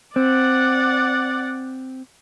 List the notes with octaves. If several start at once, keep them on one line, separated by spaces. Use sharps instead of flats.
C4 D5 F#5